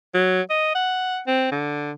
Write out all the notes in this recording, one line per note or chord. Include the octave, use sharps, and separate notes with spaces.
F#3
D#5
F#5
C4
D3